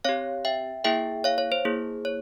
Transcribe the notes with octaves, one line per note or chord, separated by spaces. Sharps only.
C4 G4 C#5 F5
E5 G5
A#3 E4 G#4 E5 G5
C#5 F5
C#5
C5
A#3 E4 G#4
C#5